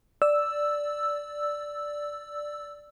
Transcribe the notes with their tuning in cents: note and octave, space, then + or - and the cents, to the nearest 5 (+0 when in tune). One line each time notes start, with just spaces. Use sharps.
D5 +0 E6 +0